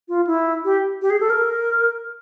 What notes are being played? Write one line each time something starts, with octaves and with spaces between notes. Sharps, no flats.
F4
E4
G4
G4
G#4
A4
A#4